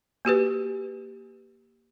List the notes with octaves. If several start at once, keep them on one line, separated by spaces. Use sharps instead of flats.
A#3 F#4 G4 B4